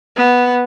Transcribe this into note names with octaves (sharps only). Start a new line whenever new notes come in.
B3